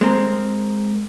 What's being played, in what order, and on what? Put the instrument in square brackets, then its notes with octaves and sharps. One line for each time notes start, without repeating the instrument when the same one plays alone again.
[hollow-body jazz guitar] G#3 C4 A#4